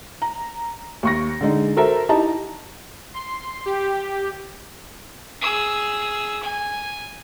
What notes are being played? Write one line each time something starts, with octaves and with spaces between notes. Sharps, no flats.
A#5
D#2 C#6 A#6
D3 G#3 D#4
F#4 A4 A#4 C5 E5 A#5
D#4 E4 G4 D#5 A5 A#5
C6
G4
G#4 E6
G#5